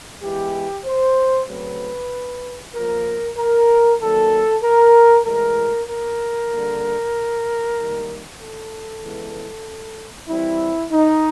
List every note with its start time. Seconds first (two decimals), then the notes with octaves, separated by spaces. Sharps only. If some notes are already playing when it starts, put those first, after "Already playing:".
0.23 E3 G#3 B3 G4
0.85 C5
1.48 C#3 F#3 A3 C4 B4
2.74 A#2 F3 A#3 A#4
3.37 A#4
3.99 D#3 F#3 A#3 A4
4.63 A#4
5.25 A2 E3 G#3 A#4
5.89 A#4
6.52 D3 G3 A#3
7.77 D#3 G3 A#3
8.40 A4
9.03 C#3 E3 G#3 B3
10.29 E3 G3 C4 E4
10.91 D#4